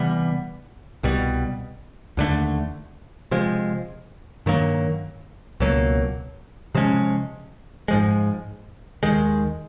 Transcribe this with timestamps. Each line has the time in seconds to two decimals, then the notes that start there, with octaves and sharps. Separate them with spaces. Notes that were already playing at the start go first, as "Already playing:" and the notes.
Already playing: C3 E3 G3 B3
1.03 C2 B2 G3
2.17 D#2 D3 F3 A3
3.31 C3 F3 G#3
4.46 G2 D#3 F#3 A#3
5.60 C#2 B2 F#3 A#3
6.75 C3 F3 G#3 C#4
7.88 G#2 F3 G#3
9.03 D#2 D#3 G#3